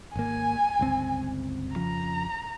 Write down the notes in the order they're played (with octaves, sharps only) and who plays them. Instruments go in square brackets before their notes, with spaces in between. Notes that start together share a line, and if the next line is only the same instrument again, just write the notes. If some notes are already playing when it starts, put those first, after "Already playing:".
[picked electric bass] G#1 A#3 [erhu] G#5
[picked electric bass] G1 C#2 C4
[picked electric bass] F2 C#3 F3 [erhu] A#5